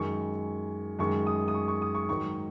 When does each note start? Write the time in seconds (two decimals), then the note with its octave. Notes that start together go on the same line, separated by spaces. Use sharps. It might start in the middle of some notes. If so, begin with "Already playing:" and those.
Already playing: F#2 D#3 G#3 C#6
0.99 F#2 D#3 G#3 C#6
1.27 D#6
1.48 D#6
1.55 C#6
1.68 C#6
1.82 D#6
1.95 C#6
2.09 G#2 D#3 F#3 C#6